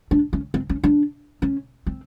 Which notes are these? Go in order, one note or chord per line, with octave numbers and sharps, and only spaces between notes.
D4
C#4
C4
C#4
D4
C#4
C4